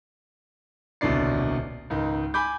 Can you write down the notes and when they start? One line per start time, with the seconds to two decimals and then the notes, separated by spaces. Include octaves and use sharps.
1.01 D#1 C2 B2 D3 D5 C7
1.90 C#2 G#2 D#3
2.34 G#5 B5 D6 G6